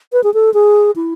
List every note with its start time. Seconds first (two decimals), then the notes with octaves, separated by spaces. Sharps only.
0.13 B4
0.24 G#4
0.34 A4
0.54 G#4
0.96 E4